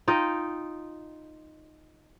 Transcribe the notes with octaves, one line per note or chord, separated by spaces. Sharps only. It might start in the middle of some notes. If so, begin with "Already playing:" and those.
D#4 F4 D#5 G5